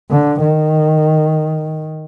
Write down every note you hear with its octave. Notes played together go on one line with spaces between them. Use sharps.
D3
D#3